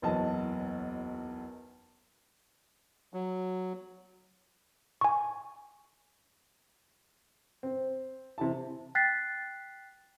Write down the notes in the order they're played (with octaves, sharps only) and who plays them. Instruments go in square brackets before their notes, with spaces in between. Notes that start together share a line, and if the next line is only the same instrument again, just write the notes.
[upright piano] F#1 B1 E2 D#5 A5
[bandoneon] F#3
[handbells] G#5 C#6
[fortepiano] C4
C3 E3 A5
[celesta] G5 F#6 A6 B6 C7